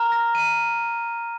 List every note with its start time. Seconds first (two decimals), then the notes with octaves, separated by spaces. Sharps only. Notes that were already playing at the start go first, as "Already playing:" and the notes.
Already playing: A#5 F6
0.12 A#6
0.35 D#7